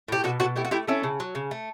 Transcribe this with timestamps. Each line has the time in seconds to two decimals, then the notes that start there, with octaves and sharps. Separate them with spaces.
0.08 A2 G4
0.24 B2 F#4 A4
0.40 B2 F#4 A4
0.56 A3 E4 G4
0.65 F#4
0.71 A3 E4 G4
0.87 A3 C#4 E4
1.03 C#3
1.20 F#3
1.35 C#3
1.51 A3